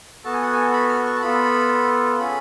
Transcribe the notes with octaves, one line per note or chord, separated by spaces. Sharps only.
B3 F#4 A4 A5
G#5
F#5
G#5
B5
F6
C#6
A5
B3 F4 A4 B5
C#4 G#4 B5